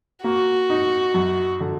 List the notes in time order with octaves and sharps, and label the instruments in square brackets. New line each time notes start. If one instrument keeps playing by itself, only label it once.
[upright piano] A#3 [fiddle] F#4
[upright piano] D#4
F#2
D3